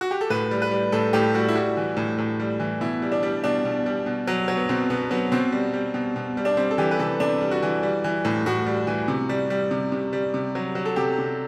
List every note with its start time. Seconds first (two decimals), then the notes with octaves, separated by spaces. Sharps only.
0.01 F#4
0.11 G4
0.21 A4
0.30 A2 B4
0.51 G3
0.62 B4
0.71 G3
0.92 A2 A4
1.13 A2 G4
1.34 G3 F#4
1.48 E4
1.55 G3 F#4
1.77 E3
1.97 A2
2.18 A2
2.40 G3
2.60 E3
2.81 B2 E4
3.02 G3
3.12 D4
3.23 G3
3.44 B2 D4
3.65 B2
3.86 G3
4.06 B2
4.27 F#3
4.48 F#3
4.57 B3
4.69 B2 C4
4.90 B2 B3
5.11 F#3 B3
5.32 B2 C4
5.52 G3
5.73 G3
5.94 B2
6.16 B2
6.37 G3
6.45 D4
6.57 G3 C4
6.71 A4
6.78 E3 G4
6.91 B4
6.99 C3 A4
7.20 C3 D4
7.41 G3
7.51 F#4
7.62 E3
7.83 G3
8.04 E3
8.25 A2
8.46 A2 F#4
8.66 G3
8.87 E3
9.08 C3
9.29 G3
9.50 G3
9.71 C3
9.92 C3
10.13 G3
10.34 C3
10.55 F#3
10.75 F#3
10.85 A4
10.96 C3 G4
11.18 C3